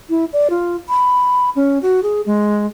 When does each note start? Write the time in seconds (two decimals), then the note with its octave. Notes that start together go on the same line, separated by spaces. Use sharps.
0.09 E4
0.33 D5
0.50 F4
0.89 B5
1.56 C#4
1.82 F#4
2.03 G#4
2.26 G#3